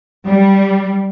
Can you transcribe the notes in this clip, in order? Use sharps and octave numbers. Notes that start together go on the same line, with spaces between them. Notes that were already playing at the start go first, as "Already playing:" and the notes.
G3